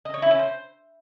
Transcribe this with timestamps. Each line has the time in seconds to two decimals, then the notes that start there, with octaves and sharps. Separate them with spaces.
0.05 D#5
0.14 C#5
0.22 E4
0.31 C#4
0.39 C5